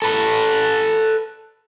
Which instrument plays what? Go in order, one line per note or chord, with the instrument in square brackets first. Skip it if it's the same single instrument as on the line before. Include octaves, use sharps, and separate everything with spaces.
[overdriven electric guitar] A4 B4